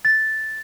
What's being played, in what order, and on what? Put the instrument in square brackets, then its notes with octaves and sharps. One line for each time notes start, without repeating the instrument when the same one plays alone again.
[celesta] A6